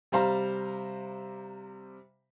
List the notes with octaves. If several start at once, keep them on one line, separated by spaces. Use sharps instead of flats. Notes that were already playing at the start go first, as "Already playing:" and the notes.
C3 G3 C5 F5 A#5